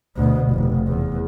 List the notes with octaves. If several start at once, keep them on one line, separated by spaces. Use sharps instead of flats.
D2 B2
F1
E2